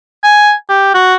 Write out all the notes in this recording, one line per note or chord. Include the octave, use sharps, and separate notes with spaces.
G#5
G4
F#4